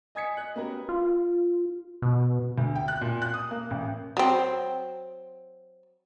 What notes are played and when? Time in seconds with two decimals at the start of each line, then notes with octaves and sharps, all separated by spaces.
0.15 D#5 G#5 D#6 G#6 B6 C#7
0.37 D#5 F#6
0.56 B3 C#4 F#4 G4 A#4 B4
0.89 F4
2.02 B2
2.58 D2
2.76 G5
2.88 F#6
3.01 A#2
3.22 F#6
3.34 D#6
3.51 A#3
3.70 A1
4.17 F#3 C4